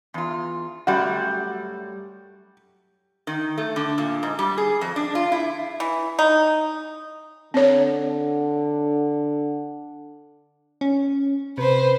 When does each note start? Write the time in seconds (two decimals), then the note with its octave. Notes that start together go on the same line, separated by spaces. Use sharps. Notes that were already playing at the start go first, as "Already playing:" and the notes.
0.14 E2 F4
0.87 F#2 G3 A3 F#4
3.27 D#3
3.58 A3
3.76 D3
3.98 A#2
4.23 G#2
4.39 G3
4.58 G#4
4.81 F2
4.96 D4
5.15 F4
5.32 E4
5.80 E3
6.19 D#4
7.54 D3 C4 C#5
10.81 C#4
11.58 C3 B4 C5